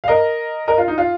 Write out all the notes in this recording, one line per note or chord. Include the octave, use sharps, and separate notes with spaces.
F5
A#4 D#5
A#4 D#5
F4
D#4
F4